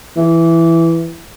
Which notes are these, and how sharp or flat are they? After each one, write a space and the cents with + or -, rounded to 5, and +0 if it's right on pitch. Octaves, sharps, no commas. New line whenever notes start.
E3 +5